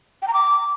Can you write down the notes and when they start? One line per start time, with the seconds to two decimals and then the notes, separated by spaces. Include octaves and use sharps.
0.22 G5
0.28 A#5
0.33 D6